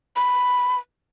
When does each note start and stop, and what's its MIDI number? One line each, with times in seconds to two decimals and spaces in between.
0.16 0.76 83